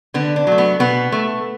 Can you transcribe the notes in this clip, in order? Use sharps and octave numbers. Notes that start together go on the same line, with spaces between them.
D3 B3
D4
F#3 A3
B3
B2 B3
A3